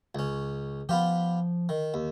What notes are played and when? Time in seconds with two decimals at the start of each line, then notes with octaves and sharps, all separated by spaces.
0.15 C#2 C#4
0.89 F3 B3 F4 G4
1.69 D#3
1.94 D#2